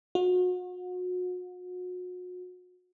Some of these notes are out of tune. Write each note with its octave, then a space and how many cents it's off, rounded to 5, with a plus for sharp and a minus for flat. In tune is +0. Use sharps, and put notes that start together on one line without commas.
F#4 -35